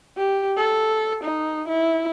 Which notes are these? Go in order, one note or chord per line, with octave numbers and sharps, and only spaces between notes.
G4
A4
D#4
E4